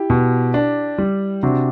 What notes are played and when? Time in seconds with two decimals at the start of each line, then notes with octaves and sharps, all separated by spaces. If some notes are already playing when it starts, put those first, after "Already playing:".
Already playing: E4 G4
0.10 B2
0.54 D4
0.98 G3
1.43 C3 D4 F#4